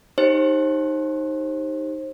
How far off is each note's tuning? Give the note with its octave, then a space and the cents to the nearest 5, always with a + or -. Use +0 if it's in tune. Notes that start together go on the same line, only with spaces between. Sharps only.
D#4 +0 G4 +0 C5 +30